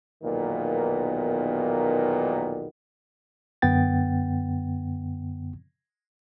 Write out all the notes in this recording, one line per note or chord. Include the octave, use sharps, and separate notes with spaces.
B1 E2 A#2 D#3 A#3 B3
F#2 D3 B3 F#5 G5 A6